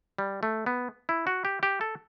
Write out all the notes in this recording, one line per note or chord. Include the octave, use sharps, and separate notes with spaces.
G3
A3
B3
E4
F#4
G4
G4
A4